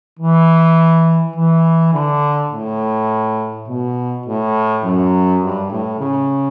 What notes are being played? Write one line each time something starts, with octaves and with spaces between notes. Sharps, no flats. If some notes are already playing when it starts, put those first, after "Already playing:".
E3
E3
D3
A2
B2
A2
F#2
G2
A2
C#3